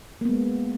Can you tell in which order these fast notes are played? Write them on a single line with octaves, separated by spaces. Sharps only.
A#3 B3 G#3